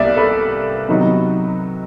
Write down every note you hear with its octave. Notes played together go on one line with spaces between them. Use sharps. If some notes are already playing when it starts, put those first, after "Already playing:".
Already playing: C2 B2 G3 A#3 D5 E5
A4 B4
C3 D#3 F#3 B3 D#4